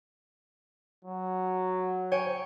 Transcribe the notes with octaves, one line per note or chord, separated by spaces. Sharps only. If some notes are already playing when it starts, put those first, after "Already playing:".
F#3
C#5 G5 G#5